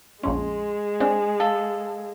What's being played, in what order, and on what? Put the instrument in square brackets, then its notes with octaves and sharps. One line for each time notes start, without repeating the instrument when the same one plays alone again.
[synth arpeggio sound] A#1 F2 C#4 [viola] G#3 [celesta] C6
[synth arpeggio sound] C4 D4 [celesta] G#5
[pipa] A4 [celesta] F5